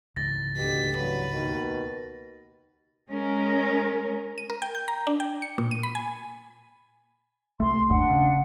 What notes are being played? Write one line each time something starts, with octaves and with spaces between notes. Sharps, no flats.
C#2 G#2 E3 A6 A#6
D2 B2 G4 B6
A1 G2 F#3 B4
D#2 B2 D#3
G#3 C#4 A#4
D#7
A#4
G5
G6
A#5
D4
G5
C#7
A#2
D#7
B5
G#5
C2 A3 C6
G1 D#2 A2 D4 F#5
C#3